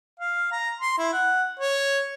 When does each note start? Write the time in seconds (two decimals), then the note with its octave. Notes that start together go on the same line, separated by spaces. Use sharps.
0.20 F5
0.52 A#5
0.80 C6
0.98 E4
1.13 F#5
1.59 C#5